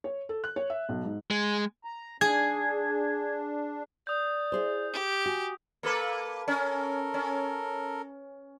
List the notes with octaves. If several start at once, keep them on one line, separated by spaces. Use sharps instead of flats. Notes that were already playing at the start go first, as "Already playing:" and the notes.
C#5
A4
F#6
C#5
E5
B1
G#2
G#3
A#5
D4 G#4 G#6
D5 D#6 G6
E4 G#4 C5
G4
F#4 G#5
A#3 A4 B4
C#4 A4 A#4
C#4